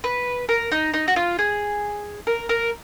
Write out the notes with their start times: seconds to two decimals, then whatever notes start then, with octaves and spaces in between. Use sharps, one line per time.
0.04 B4
0.49 A#4
0.72 D#4
0.94 D#4
1.08 F#4
1.16 F4
1.39 G#4
2.27 A#4
2.49 A#4